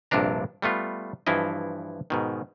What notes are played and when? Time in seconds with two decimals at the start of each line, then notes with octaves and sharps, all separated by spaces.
0.11 A#1 G2 C3 F3 D4 A#5
0.62 G3 A3 B3 F4
1.27 G2 E3 F3 E4 D#5
2.10 G#2 B2 D#3